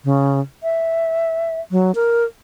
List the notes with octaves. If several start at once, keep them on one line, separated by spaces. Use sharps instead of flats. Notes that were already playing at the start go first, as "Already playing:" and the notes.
C#3
E5
F#3
A#4